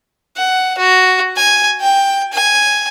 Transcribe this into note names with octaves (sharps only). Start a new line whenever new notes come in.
F#5
F#4
G#5
G5
G#5